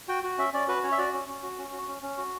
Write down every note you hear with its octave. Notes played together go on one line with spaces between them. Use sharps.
F#4 G5
F#4
C#4 E5
C#4 D5
F#4 B4
C#4 C#5
E5
F#4 D5
C#4
C#4
F#4
C#4
F#4
C#4
C#4
F#4